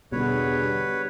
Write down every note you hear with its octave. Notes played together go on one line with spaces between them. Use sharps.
E2 B2 D3 G3 B4 C#5